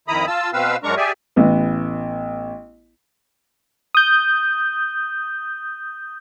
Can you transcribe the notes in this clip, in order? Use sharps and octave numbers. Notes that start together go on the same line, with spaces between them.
F2 D#3 E4 A#5 B5 D#6
F4 A5 E6
B2 C4 B4 F5 E6
F#2 G#3 D4 A#4 A#5 C#6
G4 G#4 D5 E5 G#5
A1 B3
D#6 G6